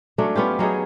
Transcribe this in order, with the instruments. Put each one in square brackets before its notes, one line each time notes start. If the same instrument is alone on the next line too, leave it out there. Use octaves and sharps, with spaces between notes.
[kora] F#3 A3 C#4 D4
B3 C#4 F4 G4
F#3 C#4 D#4 G#4